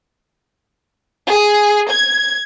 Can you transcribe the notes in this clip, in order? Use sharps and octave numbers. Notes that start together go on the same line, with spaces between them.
G#4
G#6